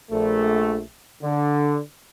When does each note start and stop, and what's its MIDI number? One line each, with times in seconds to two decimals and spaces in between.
0.11 0.81 34
0.11 0.81 57
1.23 1.79 50